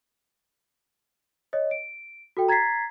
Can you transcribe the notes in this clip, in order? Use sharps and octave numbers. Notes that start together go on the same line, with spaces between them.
C#5 D#5
D7
F#4 A4 G5
A#5 G#6 A6 B6 C7